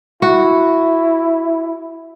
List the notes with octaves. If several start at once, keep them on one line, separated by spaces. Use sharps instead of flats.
E4 F#4